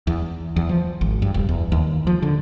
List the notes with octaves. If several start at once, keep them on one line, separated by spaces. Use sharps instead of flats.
E2
E2
F3
G#1
G2
E1
E2
D#2
F3
D3